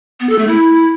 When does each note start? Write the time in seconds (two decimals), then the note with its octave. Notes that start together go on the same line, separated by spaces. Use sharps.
0.20 B3
0.29 A4
0.39 A3
0.48 E4